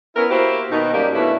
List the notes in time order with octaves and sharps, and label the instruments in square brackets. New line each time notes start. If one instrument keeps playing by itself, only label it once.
[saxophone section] B3 C#4 E4 A#4
A#3 E4 F#4 G4 C5
B2 D#3 D#4
F#2 F#3 G3 A#3 G4
B2 E3 A3 C#4 D4 E4